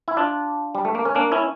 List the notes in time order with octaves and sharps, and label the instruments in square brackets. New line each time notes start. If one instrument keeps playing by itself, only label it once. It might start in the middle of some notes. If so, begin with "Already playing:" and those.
[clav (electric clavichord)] E4
D4 F4
G3
A3
A#3
C#4
A#3 D4
C#4 E4